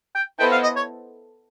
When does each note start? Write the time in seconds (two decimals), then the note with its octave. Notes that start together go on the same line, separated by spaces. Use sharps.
0.15 G5
0.39 B3 E4 A4 C5 D#5 G5
0.51 F5
0.63 D#5
0.76 C#5